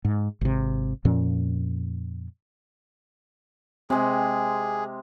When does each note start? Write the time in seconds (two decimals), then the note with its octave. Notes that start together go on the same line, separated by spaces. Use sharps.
0.05 G#2
0.41 G#1 C3
1.05 F2 A#2 F3 C#4
3.90 C3 G#3 C4 G#4